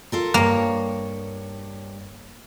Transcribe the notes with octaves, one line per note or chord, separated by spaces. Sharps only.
F4 A4 A#4
G2 A#3 C#5